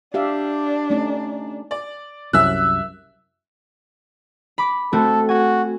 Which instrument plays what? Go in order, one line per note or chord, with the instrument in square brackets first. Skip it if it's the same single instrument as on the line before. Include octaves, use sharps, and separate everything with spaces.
[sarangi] D4 [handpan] G4 E5 F5
[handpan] A3 C#4 D#4
[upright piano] D5
[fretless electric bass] C2 F#2 [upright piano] E5 E6 F#6
[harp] B5 D6
[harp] A3 C4 F#4 [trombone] A4
[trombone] F#4 [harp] G#5